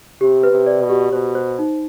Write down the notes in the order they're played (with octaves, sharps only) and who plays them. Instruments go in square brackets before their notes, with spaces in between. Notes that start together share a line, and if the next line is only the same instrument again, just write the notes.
[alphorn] C3 [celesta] G4
[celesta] B4
[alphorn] C3
[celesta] D5
[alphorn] B2
[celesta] G4
[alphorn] B2 [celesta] C5
[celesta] C5
D#4